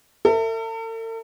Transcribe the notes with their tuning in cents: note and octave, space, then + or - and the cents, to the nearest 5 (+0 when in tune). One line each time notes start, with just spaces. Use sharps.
A4 +45 E5 +0